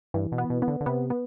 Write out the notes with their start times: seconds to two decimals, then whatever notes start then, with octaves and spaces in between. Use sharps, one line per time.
0.14 G2 E3
0.32 B2
0.38 B3
0.50 B2
0.62 B3
0.68 D3
0.81 D3
0.86 C3 B3
1.10 B3